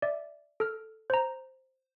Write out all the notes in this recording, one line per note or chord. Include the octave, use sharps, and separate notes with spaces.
D5 E5
A4 F6
C5 A#5